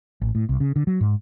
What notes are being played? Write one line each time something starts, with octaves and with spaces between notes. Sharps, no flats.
A1
A2
C2
C#3
D3
F#3
G#2